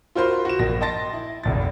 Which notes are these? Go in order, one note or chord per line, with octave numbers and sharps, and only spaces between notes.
F4 F#4 A#4 C5 B5 C6
F#4 E7
A#1 A#3 A#6
D#5 G5 A5 C6 A6 A#6
E4
F1 A#1 A6